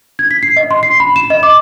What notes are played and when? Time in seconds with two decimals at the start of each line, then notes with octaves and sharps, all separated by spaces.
0.19 G#6
0.31 B6
0.43 C7
0.57 D#5
0.71 C6
0.83 C7
1.00 B5
1.16 E7
1.30 D#5
1.43 D6